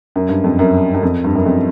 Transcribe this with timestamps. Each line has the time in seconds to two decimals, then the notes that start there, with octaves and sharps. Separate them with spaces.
0.16 F#2
0.29 G2
0.44 F2
0.59 F#2
0.94 F#2
1.03 F2
1.24 G2
1.35 F#2
1.46 F2